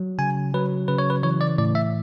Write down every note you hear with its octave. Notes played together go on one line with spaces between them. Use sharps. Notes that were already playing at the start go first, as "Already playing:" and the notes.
Already playing: F#3
C#3 G#5
F#3 B4
C#3 B4
C#5
B4
E3 C#5
D5
A2 D5
E5